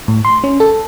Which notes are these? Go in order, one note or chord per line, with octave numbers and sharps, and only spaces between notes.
A2
C6
C#4
A4